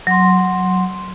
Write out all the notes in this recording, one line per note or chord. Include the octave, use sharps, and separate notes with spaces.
F#3 C6